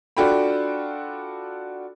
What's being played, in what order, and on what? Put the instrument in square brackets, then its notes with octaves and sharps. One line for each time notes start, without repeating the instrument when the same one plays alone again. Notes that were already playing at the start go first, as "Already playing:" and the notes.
[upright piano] D4 F4 F#4 A4 G5 B5